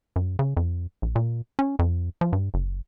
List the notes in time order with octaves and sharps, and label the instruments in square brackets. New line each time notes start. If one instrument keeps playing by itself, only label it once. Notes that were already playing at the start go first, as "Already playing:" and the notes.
[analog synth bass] F#2
C#3
F2
A#1
A#2
C#4
F2
F3
G2
F#1